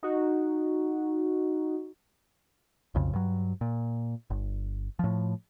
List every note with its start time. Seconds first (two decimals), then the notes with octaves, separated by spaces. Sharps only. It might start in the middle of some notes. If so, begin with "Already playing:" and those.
0.03 D#4 F#4
2.95 B1 F2 C#3
3.13 G2 F#3
3.61 A#2
4.30 G1
4.99 A2 F3